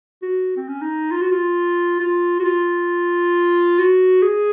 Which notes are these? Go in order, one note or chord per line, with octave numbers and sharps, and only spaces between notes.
F#4
C4
C#4
D#4
F4
F#4
F4
F4
F#4
F4
F#4
G#4